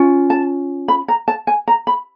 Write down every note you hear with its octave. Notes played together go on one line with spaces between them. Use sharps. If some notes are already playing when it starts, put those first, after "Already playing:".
Already playing: C#4 F4
A5
B5
A#5
A5
G#5
A#5
B5